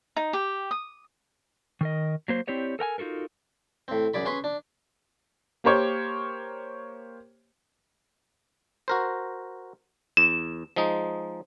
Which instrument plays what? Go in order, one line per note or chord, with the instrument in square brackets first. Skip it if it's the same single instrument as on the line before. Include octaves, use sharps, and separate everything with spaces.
[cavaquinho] D#4
G4
D#6
[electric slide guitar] D#3 A#4 D#5
F#3 A#3 C5
C4 E4 G4 C#5 D5
A4 A#4 G5 G#5
D#4 F4 F#4 A4 A#4
[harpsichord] A2 C4
F#2 G#4 D5 B5
C#4 G#4 B4 C6
D4
[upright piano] A#3 G4 A#4 C5 C#5
[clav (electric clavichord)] F#4 A#4 C5
[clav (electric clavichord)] E2 [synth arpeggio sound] E7
[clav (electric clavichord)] F3 G#3 D#4